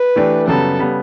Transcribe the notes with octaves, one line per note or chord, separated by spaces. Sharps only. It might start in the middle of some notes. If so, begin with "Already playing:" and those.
Already playing: B4
E3 A3 D4 G4
F#2 C#3 G3 B3 A4
C#3 G3 B3